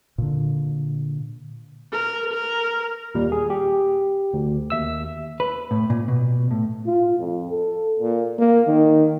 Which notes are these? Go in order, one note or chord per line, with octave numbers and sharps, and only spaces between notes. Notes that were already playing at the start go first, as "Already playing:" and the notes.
A#2 D3
A#4
A#4
D#2 A#2 G3
G#4
G4
D2
D#2 E5 E6
B4
A2
A#2
B2
A2
F4
F2
A4
A#2
A#3
D#3